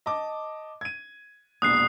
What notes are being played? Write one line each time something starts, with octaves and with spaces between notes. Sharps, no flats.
D#5 A5 D6
G#6 D#7
E1 A#1 D#6 F#6 C7